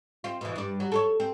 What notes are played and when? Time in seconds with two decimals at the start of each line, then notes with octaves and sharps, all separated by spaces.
0.24 C4 F4
0.41 B2 E3
0.56 G2 D5
0.80 F#3
0.92 A4 B4 C#5
1.20 C4